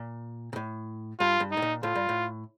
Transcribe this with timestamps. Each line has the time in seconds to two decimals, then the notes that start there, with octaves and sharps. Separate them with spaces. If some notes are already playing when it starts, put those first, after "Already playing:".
Already playing: A#2
0.53 A#2
0.56 A2
1.19 G2 F4
1.40 G2
1.51 D#4
1.57 A2
1.62 A#2
1.83 A2 F4
1.95 G2
2.09 A2